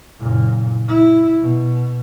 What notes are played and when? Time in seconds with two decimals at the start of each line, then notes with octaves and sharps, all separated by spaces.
0.20 F#1 A#2
0.88 E4
1.42 B2